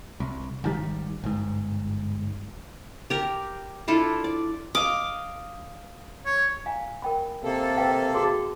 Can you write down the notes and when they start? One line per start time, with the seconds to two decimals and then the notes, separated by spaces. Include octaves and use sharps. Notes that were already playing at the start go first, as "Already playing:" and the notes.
0.20 C2
0.64 G#1 D#3 G3
1.24 G1 G#2
3.10 G4 A#4
3.88 D4 E4 F4 A4
4.24 D5
4.75 D#5 F5 D6
6.26 C#5
6.66 F5 G#5 A#5
7.02 A#4 G5 B5
7.43 C3 A#3 A4
7.77 B4 F5 G5
8.14 F#4 G#4 C6